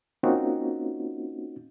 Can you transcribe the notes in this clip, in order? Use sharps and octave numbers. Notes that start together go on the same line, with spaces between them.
A#3 C4 C#4 D#4 F4 F#4